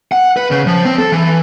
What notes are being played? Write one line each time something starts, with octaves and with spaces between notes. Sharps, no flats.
F#5
B4
C#3
F3
C4
A4
E3